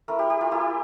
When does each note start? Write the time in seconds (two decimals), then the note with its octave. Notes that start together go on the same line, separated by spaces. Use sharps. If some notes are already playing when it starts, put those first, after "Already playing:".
0.08 A3 E4 A#4
0.19 G4
0.30 G4
0.41 F4
0.51 A#3 E4 G4